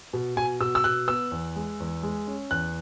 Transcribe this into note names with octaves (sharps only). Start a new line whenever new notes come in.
B2
B2 G#5
B2 E6
E6
B2 F#6
B3 E6
E2
G#3
E2
G#3
C#4
E2 F#6